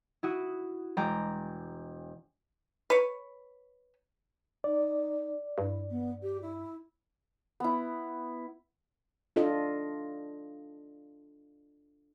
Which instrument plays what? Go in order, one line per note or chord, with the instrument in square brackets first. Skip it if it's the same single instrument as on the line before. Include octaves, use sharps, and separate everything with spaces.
[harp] E4 F#4 D#6
E1 G#3 G5 A#5 D6
[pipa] B4 C#5
[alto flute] D#4 [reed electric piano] D5
[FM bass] G2 [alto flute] E4
[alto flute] B3
G4
E4
[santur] B3 E4
[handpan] D4 F4 A4 D#5